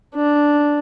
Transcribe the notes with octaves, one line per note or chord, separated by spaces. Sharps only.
D4